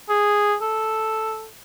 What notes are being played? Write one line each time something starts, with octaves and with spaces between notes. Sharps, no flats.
G#4
A4